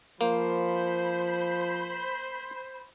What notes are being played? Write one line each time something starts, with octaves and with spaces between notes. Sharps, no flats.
F3 A#3 C5 B5